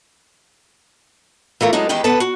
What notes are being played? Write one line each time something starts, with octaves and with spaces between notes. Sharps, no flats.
E3 A3 F4 A#4
F#3 G#3 B3 D4 D#4
E2 D#3 G#3 G4 B4 G5
D3 B3 A4 B4 A5
F#4